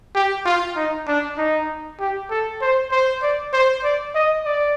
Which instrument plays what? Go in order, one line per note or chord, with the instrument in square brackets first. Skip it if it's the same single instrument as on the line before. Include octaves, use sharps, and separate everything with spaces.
[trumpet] G4
F4
D#4
D4
D#4
G4
A4
C5
C5
D5
C5
D5
D#5
D5